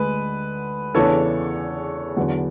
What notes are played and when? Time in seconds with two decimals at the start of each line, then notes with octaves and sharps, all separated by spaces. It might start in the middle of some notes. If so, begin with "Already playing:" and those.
Already playing: D2 D3 G#3 B4
0.94 E2 C#3 E3 B3 D4 A4 C#5
2.16 E2 D3 F#3 B3